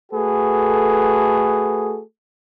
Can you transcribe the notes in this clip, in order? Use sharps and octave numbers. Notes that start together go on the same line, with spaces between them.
A3 F#4 G#4 A4 B4